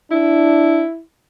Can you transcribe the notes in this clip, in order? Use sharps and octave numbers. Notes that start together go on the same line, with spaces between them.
D4 E4